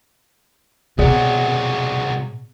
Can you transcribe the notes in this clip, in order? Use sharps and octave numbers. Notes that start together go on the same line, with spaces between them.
C2 B2 F#3 G#4 D5 F#5